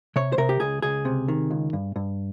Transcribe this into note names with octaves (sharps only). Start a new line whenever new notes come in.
C3 C#5
C5
C3 A#4
G4
C#2 G#4
C#2 G#4
C3
D#3
C#2
G2
G2